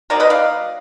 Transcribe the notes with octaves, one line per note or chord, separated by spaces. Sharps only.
F#3 A#3 D#4 A#4 D5
B4 D#5
D5 F5